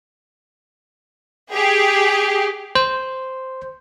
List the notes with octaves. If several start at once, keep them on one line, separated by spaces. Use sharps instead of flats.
G4 G#4
C5